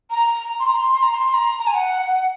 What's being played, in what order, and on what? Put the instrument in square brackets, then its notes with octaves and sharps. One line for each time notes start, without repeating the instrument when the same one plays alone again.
[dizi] A#5
C6
A#5
C6
C6
A#5
C6
A#5
A#5
G#5
F#5
F#5